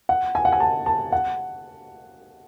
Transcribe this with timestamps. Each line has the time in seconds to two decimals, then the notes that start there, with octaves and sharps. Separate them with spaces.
0.09 F#5
0.35 G#5
0.45 F#5
0.52 G#5
0.60 A5
0.86 A5
1.12 F#5